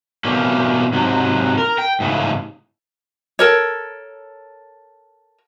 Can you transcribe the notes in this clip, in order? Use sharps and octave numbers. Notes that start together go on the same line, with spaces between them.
B2 E3 G3 A3 A#3 C#4
G#2 C3 F#3
A#4
G5
G#2 C#3 E3 A3
A4 A#4 C#5